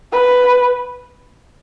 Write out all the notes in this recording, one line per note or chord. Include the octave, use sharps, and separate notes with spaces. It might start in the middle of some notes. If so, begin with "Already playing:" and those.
B4